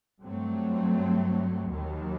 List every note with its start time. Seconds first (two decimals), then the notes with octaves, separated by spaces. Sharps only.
0.21 G2 F#3 A3 C4
1.69 D#2 D#3 F#3